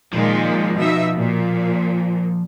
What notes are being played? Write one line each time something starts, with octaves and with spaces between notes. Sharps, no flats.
A#2 D#3 F3 G#3
B2 D#4 E5
A#2